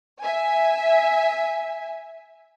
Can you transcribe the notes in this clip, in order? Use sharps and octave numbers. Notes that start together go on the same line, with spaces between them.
E5 G#5